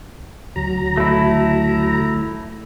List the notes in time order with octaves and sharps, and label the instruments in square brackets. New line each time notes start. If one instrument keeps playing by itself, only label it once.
[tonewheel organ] D2 F#3 A#5
[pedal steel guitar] A3 E4